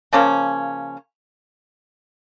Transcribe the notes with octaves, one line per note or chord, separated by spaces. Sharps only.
C#3 F3 A#3 C#4